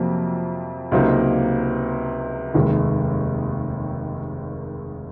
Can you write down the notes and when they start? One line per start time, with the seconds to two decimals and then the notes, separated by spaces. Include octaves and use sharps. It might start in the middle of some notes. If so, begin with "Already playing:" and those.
Already playing: F2 C3 F#3 A#3
0.92 C#2 C3 F#3 A#3 D#4
2.54 F1 D#2 D#3 G#3